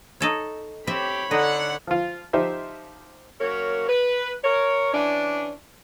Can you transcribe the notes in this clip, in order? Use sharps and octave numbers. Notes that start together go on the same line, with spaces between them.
D#4 A4 C#5
C4 G4 C5 C#5 E5 B5
D3 D#4 F#5
F3 F4
F3 D#4 G4 C5 E5
F#3 A#3 C#4 A#4 C#5
B4
A#4 C#5
E3 C#4 D4